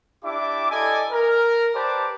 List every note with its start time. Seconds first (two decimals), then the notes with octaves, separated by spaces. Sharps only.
0.24 D4 E4 G4 E5 D6
0.71 E4 A4 D5 D#5 G#5
1.10 A#4
1.75 G4 B4 C5 D5 A5 D6